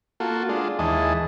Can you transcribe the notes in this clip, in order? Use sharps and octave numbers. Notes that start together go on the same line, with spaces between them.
A#3 F4 F#4 A4
G#3 D4 F4
D#2 E3 G#3 D#5 A5